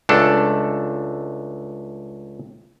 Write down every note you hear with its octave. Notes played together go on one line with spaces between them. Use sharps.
C#2 A3 D4 A4